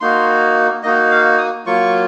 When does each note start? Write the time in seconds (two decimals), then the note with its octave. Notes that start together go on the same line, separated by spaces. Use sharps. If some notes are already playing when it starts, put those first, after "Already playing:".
0.01 A#3 D#4 F#4 C6
0.83 A#3 D#4 F#4 D#5
1.11 F5
1.38 D#6
1.66 F#3 A#3 F4 C#6